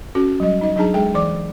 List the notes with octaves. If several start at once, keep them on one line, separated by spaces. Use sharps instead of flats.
C#4 F#4 A4
F#3 G3 D#5
D#4 D#5
F#3 D4 D#4 G#4 A5 A#5
G#3 G#4 A4 G5
E3 D5 D6